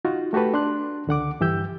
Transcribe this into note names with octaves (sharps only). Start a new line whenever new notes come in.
D#4 F4 F#4
A3 F#4 G4 A4 B4
D4 C6 F#6
C#2 D3 F#5 D6
G2 E3 G4 E6 G6